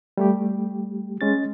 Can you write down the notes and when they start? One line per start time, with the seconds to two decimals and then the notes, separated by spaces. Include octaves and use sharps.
0.17 G3 A3 G4
1.21 G#3 C#4 A6